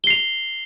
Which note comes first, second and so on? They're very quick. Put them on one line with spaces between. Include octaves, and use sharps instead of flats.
G7 C7 F7